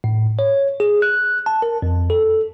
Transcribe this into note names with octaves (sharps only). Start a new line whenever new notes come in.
A2
C#5
G#4
F#6
A5
A#4
F2
A4